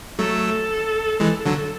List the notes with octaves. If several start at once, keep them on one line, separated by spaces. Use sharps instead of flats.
F#3 A3 A4
E3 G#3 A4
D3 F#3